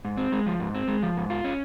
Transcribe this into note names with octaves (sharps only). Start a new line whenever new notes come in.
G#2
C4
G#3
F3
G#2
C4
G#3
F3
G#2
F4
C#4